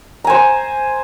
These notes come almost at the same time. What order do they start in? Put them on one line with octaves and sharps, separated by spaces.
A#5 G#5 C5